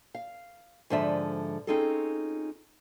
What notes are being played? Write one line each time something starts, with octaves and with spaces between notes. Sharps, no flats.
F5
G#2 D3 F3 D5 E5
C4 C#4 D#4 F4 G#4 A4